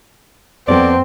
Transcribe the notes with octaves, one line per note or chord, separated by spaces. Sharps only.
F2 B3 C4 A4 D5